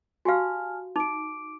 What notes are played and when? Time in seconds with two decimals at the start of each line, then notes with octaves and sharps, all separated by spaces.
0.25 F#4 G4 F5 G#5 A5 F6
0.96 D#4 D6 D7